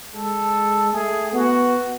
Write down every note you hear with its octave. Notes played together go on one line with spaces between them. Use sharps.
G#3 A4
A3 G#4
B3 F#4